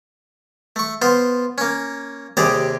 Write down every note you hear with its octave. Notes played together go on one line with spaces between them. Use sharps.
A3 C#6
B3 F4 C5
A#3 C#4
D#2 C3 G4 G#4 D5 D#6